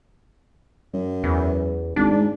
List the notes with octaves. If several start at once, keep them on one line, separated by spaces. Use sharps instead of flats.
F#2
E2
G#1 D4
G#2